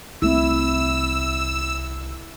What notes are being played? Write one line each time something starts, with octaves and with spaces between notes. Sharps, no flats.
C2 A3 C4 E4 E6